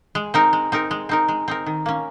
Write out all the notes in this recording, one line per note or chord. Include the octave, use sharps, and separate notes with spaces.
G#3
C4 D#4 A#4
G#3
C4 D#4 A#4
G#3
C4 D#4 A#4
G#3
C4 D#4 A#4
D#3
A#3 C#4